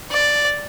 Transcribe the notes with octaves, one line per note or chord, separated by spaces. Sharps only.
D5